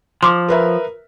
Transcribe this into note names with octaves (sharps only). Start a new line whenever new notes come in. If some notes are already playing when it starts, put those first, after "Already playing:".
F3 C6 D6
A#4 B4 E5